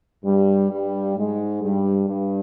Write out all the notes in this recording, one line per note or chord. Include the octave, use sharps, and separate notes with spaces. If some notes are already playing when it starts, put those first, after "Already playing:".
G2 G3
G2 G3
G#2 G#3
G2 G3
G2 G3